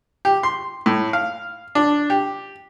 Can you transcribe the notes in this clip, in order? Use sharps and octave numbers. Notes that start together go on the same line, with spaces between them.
G4
C6
A2
F5
D4
G4